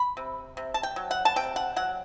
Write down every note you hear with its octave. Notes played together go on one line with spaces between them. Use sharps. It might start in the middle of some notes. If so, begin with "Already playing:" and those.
Already playing: B5
C3
C3
A5
G5
F#3
F#5
A5
C3 G5
F#5
F#3 F#5